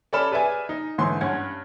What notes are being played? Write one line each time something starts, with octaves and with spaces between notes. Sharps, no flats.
C#4 A4 D5 B5 F6 E7
G#4 B4 D5 E5 G#5
D#4
G#2 D3 E3 C#5 C6
G2 C#4 F#5 G#6